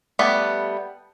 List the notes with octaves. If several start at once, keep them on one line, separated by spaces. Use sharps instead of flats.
G3 A3 B3